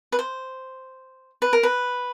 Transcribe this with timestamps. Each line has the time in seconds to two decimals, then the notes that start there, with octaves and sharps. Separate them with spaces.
0.12 B4
0.19 C5
1.42 B4
1.53 A#4
1.63 B4